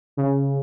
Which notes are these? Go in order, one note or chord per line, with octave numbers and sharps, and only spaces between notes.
C#3